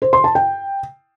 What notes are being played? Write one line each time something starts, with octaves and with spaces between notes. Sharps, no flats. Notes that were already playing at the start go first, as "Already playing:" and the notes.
C5
C6
A5
G5